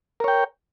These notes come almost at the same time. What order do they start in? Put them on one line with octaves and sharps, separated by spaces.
A#4 C#5 G5